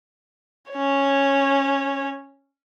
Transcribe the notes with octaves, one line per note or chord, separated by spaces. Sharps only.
C#4 C#5